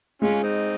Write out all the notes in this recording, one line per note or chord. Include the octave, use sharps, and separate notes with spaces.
G#3 C#4 F4
C4 D#4